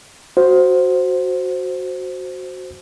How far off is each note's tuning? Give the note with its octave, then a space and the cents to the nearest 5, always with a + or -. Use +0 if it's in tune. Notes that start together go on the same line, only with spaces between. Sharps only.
F#4 +0 C5 +0